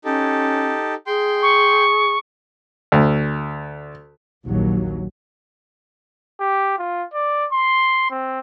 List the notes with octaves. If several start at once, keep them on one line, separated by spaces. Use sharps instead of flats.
C#4 D#4 G4 A4
G#4 G5 C6
C#6
D2
A#1 D#2 F#3
G4
F4
D5
C6
C4